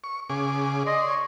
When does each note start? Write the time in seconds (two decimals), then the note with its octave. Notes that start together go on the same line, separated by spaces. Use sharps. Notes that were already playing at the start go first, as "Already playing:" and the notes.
0.04 C#6
0.30 C#3 G#4 D6
0.87 D5 D#5 C6
1.06 C#5